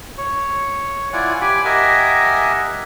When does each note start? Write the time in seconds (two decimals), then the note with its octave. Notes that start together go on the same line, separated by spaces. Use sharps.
0.18 C#5
1.13 E4 F4 D5 F#5 G#5
1.41 G4 G#5 B5 D6
1.65 G4 A#4 D#5 E5 F#5 G#5